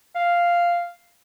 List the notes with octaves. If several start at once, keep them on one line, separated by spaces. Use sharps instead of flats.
F5